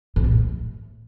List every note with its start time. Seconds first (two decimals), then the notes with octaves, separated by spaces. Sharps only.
0.16 A#2
0.24 E2
0.32 A2